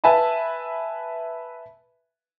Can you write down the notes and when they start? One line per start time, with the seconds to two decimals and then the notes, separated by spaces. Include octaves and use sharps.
0.04 B4 E5 G#5 A5 B5